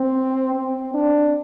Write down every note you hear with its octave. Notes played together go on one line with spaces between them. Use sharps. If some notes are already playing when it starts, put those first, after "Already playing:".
Already playing: C4
C4
D4